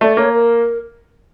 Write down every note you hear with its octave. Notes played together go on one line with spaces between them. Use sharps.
A3 D5
A#3 C#5
A#4